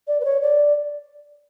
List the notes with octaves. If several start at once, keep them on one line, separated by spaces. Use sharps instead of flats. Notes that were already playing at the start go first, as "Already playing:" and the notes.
D5
B4
C#5
D5